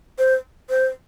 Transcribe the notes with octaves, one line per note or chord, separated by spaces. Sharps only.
C5
C5